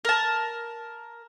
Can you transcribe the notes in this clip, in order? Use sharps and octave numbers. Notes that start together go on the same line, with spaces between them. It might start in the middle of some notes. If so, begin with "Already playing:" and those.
A#4 A5